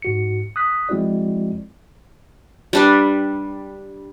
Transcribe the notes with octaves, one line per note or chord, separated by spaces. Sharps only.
G#2 F#4 C#7
D#6 F#6 B6
F3 G#3 C4 E4 F#4 D5
G3 D4 B4